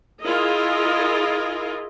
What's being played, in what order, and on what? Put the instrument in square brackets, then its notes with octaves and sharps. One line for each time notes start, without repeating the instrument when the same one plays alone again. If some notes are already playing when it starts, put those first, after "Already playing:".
[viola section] E4 F4 G#4 A#4 D#5